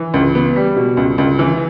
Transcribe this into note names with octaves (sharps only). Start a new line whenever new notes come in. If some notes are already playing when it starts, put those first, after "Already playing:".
Already playing: E3
C#2
B3
G3
B2
C#2
C#2
E3